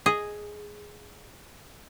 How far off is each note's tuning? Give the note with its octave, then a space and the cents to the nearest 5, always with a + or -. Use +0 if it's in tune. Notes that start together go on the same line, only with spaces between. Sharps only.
G#4 +0 D#5 +0